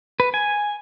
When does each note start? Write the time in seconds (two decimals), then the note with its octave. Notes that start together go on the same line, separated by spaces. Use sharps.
0.20 B4
0.34 G#5